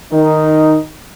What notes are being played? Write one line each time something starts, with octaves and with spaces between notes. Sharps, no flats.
D#3 D#4